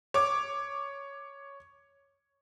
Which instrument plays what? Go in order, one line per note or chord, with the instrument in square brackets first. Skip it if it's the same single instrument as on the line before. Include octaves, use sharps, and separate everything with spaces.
[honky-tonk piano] C#5 D6